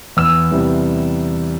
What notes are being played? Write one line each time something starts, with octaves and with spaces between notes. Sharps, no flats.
E2 E6
C3 E3 G3